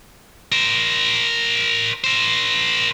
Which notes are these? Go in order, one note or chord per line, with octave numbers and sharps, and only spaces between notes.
A#4 C5
A#4 C5